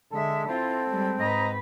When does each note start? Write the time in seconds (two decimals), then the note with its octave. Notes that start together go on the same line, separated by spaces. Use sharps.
0.12 D3 G#3 A4 E5
0.48 C4 E4 F4
0.89 G3 G#3
1.20 G#2 B4 D#5 A#5